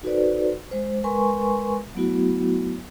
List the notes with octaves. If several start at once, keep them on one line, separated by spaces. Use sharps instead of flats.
D#4 F#4 A4 B4 C5 D5
G#3 C5
G#3 A#4 B4 G#5 C6 C#6
F#3 A3 B3 E4 F#4